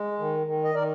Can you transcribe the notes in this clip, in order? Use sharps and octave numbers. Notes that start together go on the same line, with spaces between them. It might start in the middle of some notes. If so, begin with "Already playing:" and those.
Already playing: G#3
D#3
D#3
D#5
D#3 A#4 D5